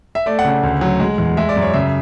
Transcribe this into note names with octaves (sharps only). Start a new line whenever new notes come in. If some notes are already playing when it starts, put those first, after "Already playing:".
E5
A3 D5
F#5
C#3
F#5
D2
F#3
G#3
E2
G#3 E5
D5
F#2
C#5
C#3 E5